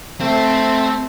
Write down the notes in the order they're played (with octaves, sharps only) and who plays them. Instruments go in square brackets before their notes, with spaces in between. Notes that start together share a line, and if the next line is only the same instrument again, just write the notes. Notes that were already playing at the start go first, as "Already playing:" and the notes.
[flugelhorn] A3 [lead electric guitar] C4